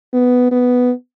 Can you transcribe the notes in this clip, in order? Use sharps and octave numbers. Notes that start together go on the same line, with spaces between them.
B3
B3